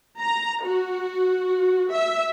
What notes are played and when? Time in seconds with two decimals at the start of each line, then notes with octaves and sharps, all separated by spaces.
0.20 A#5
0.64 F#4
1.92 E5